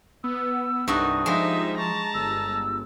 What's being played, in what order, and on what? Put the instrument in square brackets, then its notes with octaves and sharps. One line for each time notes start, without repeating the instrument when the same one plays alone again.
[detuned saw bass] B3 [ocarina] E6
[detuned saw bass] C2 [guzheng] G2 F#4 E5 [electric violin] D#4 [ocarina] D#6
[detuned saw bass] F3 [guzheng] G#3 G4 [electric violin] D#4 E5
[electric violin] A5 A#5 [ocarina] C#6
[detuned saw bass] G1 [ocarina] E6